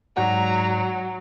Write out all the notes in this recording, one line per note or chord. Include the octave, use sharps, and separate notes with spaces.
G#2 F#3 F#4 D5 F#5 A#5